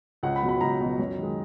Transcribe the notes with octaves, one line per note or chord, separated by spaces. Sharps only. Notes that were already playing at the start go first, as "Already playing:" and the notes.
C#2 F#5
B5
B2 F#3
B5
C#2 A#5
B2 F#3
F#2
D#3 G#3